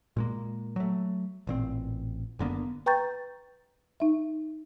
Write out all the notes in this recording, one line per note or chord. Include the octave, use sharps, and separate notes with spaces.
A#2 G#3 A#3
F#3 A3
A1 A#2 C4
F#1 D3 A#3 B3
B4 G5 A#5 C#6 G6 A6
D#4 E5